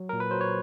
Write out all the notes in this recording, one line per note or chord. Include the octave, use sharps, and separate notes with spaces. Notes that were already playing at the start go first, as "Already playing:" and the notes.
Already playing: F#3
A#2 A#4
B4
F#3 C5
C#5